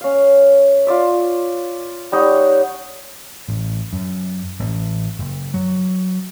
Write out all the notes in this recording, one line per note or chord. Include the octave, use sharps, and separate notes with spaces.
C#4 F5
F4 D5 E5
G3 D#4 C#5 F#5
A1
F#2
A1
F#1
F#3